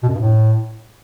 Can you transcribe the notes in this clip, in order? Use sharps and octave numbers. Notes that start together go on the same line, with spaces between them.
B2
F#2
G2
A2